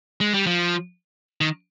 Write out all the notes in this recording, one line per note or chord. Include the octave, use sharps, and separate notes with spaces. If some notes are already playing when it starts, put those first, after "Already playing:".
G#3
G3
F3
D#3